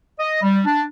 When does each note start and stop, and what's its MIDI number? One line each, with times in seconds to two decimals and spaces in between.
0.19 0.38 75
0.42 0.60 55
0.65 0.83 62